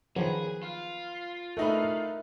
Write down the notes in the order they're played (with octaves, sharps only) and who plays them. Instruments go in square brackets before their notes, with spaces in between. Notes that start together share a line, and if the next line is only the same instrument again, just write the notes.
[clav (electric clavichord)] D#3 F3 F#3 [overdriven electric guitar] G#4 [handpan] B4
[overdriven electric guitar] F4
[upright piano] A3 D#4 B4 [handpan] A#4 E5